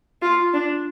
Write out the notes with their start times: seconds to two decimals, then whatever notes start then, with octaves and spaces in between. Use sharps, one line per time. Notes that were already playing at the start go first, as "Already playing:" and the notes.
0.22 F4
0.53 D4